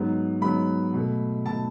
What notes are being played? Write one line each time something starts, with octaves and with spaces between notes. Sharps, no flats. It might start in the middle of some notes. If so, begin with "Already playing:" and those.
Already playing: G#2 F#3 B3
G#2 F#3 B3 B5
B2 A3
B2 A3 A5